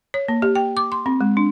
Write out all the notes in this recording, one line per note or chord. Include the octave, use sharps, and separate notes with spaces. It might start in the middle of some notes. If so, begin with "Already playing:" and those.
C#5
A#3
G4
G5
D6
C6
C4
G#3
D4